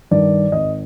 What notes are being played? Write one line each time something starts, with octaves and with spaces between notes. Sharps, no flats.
G2 D#3 D5
G#1 D#5